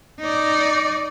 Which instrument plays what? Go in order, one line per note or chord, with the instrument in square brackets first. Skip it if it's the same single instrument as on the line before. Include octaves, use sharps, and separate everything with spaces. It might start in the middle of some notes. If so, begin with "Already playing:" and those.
[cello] D#4 D5